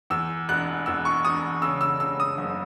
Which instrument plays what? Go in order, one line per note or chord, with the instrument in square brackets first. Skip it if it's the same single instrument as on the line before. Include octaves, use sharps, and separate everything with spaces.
[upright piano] E2 E6
E1 F#6
E2 E6
C#6
E1 D#6
C#3 E6
E6
C#3 E6
D#6
F#1